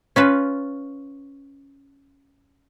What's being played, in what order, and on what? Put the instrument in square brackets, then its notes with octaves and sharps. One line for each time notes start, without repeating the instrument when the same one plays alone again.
[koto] C#4 F4 B4